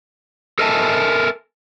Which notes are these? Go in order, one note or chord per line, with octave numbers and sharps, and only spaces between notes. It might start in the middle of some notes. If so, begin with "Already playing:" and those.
A4 A#4 D#5 E5 G#5 A5